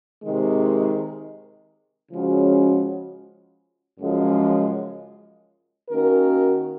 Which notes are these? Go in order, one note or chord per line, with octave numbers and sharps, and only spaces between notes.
C3 D#3 G#3
C#3 F3 G#3 C#4 F#4
F#2 C#3 F3 G#3
D#3 A#3 C#4 F#4 A#4